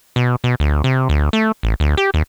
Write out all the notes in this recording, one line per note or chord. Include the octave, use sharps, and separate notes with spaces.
B2
B2
D2
C3
D2
A3
A1
D2
G4
D#2